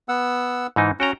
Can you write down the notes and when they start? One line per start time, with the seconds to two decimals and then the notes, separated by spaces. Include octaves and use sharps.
0.09 B3 F#5 E6
0.76 G#2 E3 D#4
1.00 C#4 F#4 G5 A#5